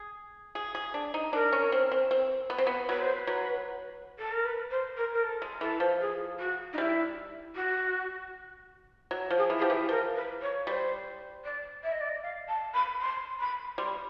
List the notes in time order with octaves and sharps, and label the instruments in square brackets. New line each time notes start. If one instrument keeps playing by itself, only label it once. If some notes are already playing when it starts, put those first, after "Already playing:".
Already playing: [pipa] G#4
G#4
G#4
D4
D#4
[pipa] D4 [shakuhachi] A#4
[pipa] C#4
C4
C4
C4
B3
C4
B3
[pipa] F#3 [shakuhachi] B4
[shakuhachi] C5
B4
[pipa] F#3
[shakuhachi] A4
A#4
B4
C5
A#4
A#4
A4
[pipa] G#3
[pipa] E3 [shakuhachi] A4
[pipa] F3
[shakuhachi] G#4
F#4
D#4
[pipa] G3 [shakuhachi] E4
[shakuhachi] F#4
[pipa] F#3
F3
[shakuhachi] G#4
[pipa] E3
[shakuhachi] G#4
[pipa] F3 [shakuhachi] G4
[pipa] E3
[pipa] F3 [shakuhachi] A#4
[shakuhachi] B4
C#5
[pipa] G3 [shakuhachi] C5
[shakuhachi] D5
E5
D#5
D5
D#5
F5
A5
B5
C6
B5
[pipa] G3 [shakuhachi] C6